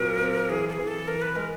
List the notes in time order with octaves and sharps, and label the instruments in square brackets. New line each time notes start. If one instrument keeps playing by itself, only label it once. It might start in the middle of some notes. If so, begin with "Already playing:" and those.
Already playing: [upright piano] A#2 F#3 C4 [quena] A#4
[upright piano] C4
[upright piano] E3 [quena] G#4
[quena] A4
G#4
[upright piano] E3
[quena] A4
[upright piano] E3 [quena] A#4
[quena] B4
[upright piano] G#3 [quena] A#4